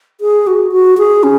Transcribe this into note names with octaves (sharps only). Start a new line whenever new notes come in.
G#4
F#4
F#4
G#4
C#4